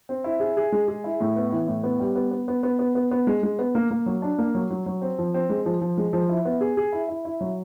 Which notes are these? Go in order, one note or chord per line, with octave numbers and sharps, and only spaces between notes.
C4
E4
G#4
G#4
G#3
G#4
E4
A2
B3
E3
A2
B3
G3
B3
B3
B3
B3
B3
B3
B3
G#3
G#3
B3
A#3
A#3
F#3
D4
A#3
F#3
F#3
F#3
C4
F3
C4
G#3
F3
F3
G#3
F3
E4
B3
G#4
G#4
E4
E4
E4
F#3